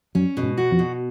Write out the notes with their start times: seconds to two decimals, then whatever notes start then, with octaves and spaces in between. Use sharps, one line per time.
0.15 F#2 F#3 C#4
0.37 B2
0.43 G#2 G#3
0.58 F#4
0.71 F2 F3
0.79 B2